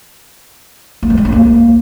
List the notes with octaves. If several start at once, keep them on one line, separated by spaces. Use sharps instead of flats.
A3
G3
G#3
C#4
A#3